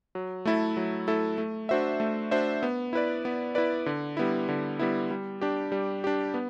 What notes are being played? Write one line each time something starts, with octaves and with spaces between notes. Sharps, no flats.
F#3
A3 E4 A4
F#3
A3 E4 A4
A3
D4 F#4 C5 E5
A3
D4 F#4 C5 E5
B3
E4 B4 D5
B3
E4 B4 D5
D3
G3 B3 E4
D3
G3 B3 E4
G3
D4 G4
G3
D4 G4
B3